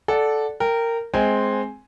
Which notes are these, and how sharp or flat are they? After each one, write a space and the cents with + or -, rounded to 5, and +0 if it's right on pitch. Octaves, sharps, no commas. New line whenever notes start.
A4 -10 D5 +0 F#5 +0
A#4 -15 G5 +0
G#3 +15 C4 +0 G#5 +0